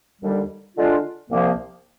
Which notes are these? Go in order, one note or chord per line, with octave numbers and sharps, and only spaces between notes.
D#2 D3 G3
D3 G#3 D4 F4
C2 C3 F3 A#3